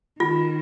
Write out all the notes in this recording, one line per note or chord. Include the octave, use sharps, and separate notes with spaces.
D#3 F4